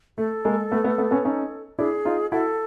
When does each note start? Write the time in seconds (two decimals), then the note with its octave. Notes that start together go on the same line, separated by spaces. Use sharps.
0.18 A3 A4
0.45 G#3 A#3
0.72 A3 B3
0.84 A3 B3
0.98 A3 B3
1.11 B3 C#4
1.25 C#4 D#4
1.79 D4 E4 G#4
2.05 D#4 F4
2.32 E4 F#4 A4